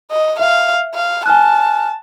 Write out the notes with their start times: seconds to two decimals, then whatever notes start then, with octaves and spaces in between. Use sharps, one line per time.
0.11 D#5
0.39 E5 F5
0.95 F5
1.26 G#5 A5 F6 F#6